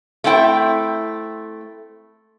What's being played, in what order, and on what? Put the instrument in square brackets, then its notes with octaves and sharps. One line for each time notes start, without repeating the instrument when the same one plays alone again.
[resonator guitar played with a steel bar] A3 C4 E4 G5